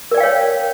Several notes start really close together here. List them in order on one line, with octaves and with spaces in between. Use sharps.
A#4 D5 G5 F5 C#5